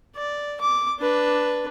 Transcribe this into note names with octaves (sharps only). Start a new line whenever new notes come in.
D5
D6
D4 B4